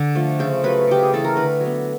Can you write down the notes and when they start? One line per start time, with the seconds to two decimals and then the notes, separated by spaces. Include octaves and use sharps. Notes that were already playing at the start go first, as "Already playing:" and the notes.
Already playing: D3
0.15 F3 A3
0.39 C#3 C5
0.63 F#3 A3 B4
0.87 C#3 G4
1.03 G#4
1.13 E3 A3 A4
1.24 A#4
1.36 D3 B4
1.60 F#3 B3